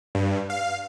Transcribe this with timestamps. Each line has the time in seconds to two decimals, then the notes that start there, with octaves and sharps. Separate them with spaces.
0.15 G2
0.50 F5